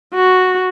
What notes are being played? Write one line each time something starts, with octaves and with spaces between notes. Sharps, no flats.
F#4